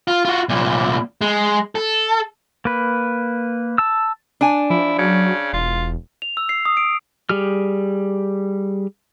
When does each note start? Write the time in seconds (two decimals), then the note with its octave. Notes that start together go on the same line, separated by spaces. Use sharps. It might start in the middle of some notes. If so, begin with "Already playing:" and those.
0.08 F4
0.25 F4 F#4
0.49 C2 A#2
1.21 G#3
1.75 A4
2.65 A#3 B4
3.78 A5 E6
4.41 D4 G#5
4.70 F3 E4
4.99 C#3 F#3
5.53 E1 F4
6.22 F7
6.37 E6
6.49 C7
6.65 D#6
6.77 D7
7.29 G3 G4 G#4 F6